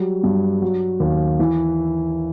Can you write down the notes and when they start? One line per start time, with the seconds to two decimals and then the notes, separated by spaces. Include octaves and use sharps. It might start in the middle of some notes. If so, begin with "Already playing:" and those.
Already playing: F#3 G3
0.23 G2
0.62 F#3
1.00 D#2
1.39 E3